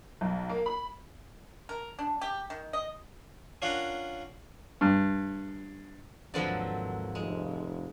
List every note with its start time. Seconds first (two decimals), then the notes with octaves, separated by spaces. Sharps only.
0.21 B1
0.49 A#3
0.66 B5
1.69 A#4
1.99 D4
2.21 G4
2.50 D#3
2.73 D#5
3.62 C#4 D4 F4 A#4 F#5 A#5
4.81 G2
6.34 G#1 D#2 D3 F3 F#3 C4 B4 D5
7.15 F1 G#3